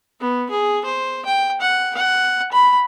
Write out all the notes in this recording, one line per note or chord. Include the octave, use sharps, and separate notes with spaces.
B3
G#4
C5
G5
F#5
F#5
B5